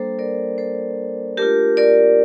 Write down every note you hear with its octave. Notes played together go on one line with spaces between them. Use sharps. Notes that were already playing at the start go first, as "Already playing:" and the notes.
Already playing: G3 A#3 D4 A4 C5
A#4 D5
A4 C5
A3 D4 F4 G4 A#4
A#4 D5